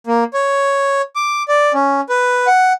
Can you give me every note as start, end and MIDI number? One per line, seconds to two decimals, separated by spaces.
0.07 0.24 58
0.34 1.02 73
1.16 1.43 86
1.48 1.72 74
1.74 2.01 61
2.09 2.47 71
2.47 2.73 78